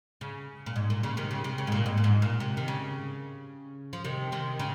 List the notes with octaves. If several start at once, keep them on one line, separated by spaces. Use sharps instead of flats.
C#3
A#2
G#2
A#2
C#3
C3 D#3
C#3
C3
C#3
G#2
A#2
G#2
A#2
G#2
A#2
C3
D#3
C#3
F3
C3 D#3
C3 D#3
C#3